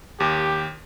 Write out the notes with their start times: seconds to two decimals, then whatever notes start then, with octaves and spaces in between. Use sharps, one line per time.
0.20 D#2 G4